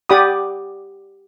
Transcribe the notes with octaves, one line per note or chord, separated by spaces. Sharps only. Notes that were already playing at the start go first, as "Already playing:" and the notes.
G4 D5 F#5 B5 D6 D#6